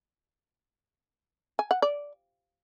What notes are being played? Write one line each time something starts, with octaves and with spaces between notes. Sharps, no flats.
G#5
F#5
D5